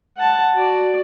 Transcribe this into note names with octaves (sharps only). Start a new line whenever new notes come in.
F#5 A5
F#4 D5